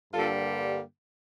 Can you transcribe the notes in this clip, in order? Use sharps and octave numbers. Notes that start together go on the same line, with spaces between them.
G2 D3 G3 A#3 F4 A4